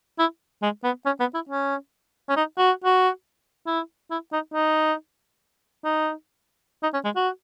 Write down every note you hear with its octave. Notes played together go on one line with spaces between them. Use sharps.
E4
G#3
B3
C#4
B3
E4
C#4
C#4
D#4
F#4
F#4
E4
E4
D#4
D#4
D#4
D#4
C#4
G#3
F#4